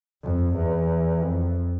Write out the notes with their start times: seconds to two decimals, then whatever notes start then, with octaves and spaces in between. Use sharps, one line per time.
0.23 F2
0.56 E2
1.22 F2